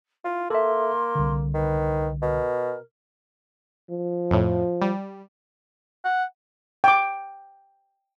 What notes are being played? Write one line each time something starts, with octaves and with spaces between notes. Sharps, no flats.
E4 F4
A#3 A4 E5 C6
C2 D3
D#3 B4
B2 A#4
F3
F2 A2
G3
F#5
G5 D6